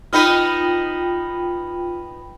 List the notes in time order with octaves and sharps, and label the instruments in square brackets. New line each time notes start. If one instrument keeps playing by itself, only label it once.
[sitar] B3 D#4 B4 [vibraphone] F4 G5